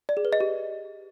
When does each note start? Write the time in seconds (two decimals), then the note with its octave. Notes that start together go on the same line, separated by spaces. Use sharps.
0.09 D5
0.17 G#4
0.25 B4
0.33 D#5
0.40 G4